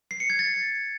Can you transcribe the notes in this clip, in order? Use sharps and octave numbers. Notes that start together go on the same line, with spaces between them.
C7
C#7
G#6
A6